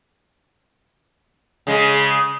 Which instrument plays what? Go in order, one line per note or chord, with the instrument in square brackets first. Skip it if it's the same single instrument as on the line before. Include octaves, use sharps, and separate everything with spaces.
[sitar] C#3 G#3